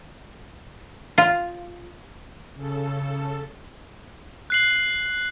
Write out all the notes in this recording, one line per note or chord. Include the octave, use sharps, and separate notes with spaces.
F4
C#3 A4
F#6 C7 F#7